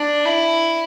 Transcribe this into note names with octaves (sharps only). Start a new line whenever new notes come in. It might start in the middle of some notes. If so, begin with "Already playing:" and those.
Already playing: D4
E4